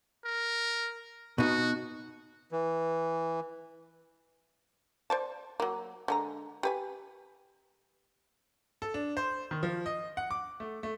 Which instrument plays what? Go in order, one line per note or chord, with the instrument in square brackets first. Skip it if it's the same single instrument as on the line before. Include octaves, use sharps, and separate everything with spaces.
[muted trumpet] A#4
[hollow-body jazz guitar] B2 D#4 [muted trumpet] F#4
[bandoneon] E3
[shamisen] C5 D5 A5
F#3 A#3
D3 G#3 A#5
G4 B4 G#5
[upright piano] A4
D4
C5
D#3
F3
D#5
F#5
D6
A3
A3